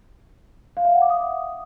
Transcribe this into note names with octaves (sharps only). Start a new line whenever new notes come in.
F5
E5
F#5
D6
D#6